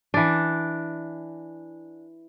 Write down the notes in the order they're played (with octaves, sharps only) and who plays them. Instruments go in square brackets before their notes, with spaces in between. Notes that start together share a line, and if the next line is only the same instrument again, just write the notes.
[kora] E3 D4